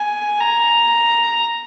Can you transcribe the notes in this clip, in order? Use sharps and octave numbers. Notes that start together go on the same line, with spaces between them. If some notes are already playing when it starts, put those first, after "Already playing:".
Already playing: G#5
A#5